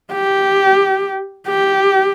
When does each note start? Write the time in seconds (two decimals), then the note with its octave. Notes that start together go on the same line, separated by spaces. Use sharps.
0.12 G4
1.48 G4